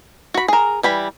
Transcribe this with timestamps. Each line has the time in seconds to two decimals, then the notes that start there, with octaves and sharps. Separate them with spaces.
0.34 F#4 B5
0.48 G#4 A#4
0.83 E3 G3 B5